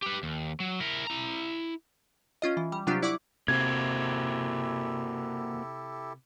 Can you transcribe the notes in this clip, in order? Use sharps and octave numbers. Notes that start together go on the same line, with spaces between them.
G4 B4
D#2
F#3
E4 A#4
E4 A#5
C#4 F4 D#5
E3
G3
C3 F#3 D4 F4 G4
E4 D5 F#5 C#6 D6
C3 A#3 E4 F#4 G4 A4 C5 G#6